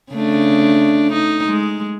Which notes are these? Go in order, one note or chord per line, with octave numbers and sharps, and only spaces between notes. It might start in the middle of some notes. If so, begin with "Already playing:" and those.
C#3 A3 D4
D#4
G#3